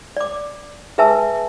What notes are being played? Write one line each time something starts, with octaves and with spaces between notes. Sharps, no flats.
D5 D6
G#4 B4 E5 G#5 A5 E6